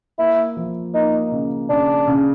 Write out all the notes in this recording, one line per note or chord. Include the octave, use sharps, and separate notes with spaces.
A#3 E4
F3
A#3 D#4
C#3
C#3 D4
C#3